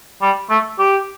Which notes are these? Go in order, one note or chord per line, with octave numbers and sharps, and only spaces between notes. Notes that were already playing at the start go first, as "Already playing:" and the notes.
G3
A3
G4